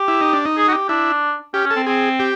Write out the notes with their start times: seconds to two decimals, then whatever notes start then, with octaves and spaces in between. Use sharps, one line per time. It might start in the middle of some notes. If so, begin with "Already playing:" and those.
Already playing: G4
0.08 E4
0.21 D#4
0.33 D4
0.45 D#4
0.57 G#4
0.68 F#4
0.73 G4
0.89 D4 E4
1.54 C#4 G4
1.64 C#4
1.71 A4
1.76 C4
1.86 C4 G#4
2.20 G4